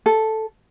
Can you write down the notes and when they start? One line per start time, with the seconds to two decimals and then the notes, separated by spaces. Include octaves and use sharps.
0.06 A4